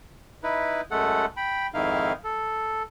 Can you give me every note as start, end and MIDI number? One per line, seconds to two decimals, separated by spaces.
0.43 0.81 63
0.43 0.81 64
0.43 0.81 71
0.91 1.26 42
0.91 1.26 56
0.91 1.26 57
0.91 1.26 69
0.91 1.26 78
1.37 1.67 79
1.37 1.67 83
1.74 2.13 41
1.74 2.13 44
1.74 2.13 51
1.74 2.13 63
1.74 2.13 64
1.74 2.13 77
2.24 2.83 69